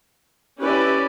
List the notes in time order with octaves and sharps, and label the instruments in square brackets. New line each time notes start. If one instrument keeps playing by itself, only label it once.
[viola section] C#4 E4 G4 B4 D5